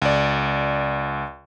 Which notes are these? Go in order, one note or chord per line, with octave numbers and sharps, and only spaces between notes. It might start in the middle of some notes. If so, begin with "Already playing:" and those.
C#2 D5